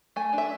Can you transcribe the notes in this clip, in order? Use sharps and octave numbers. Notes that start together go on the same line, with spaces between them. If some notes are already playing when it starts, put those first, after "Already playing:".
A3 G#5
D4
E5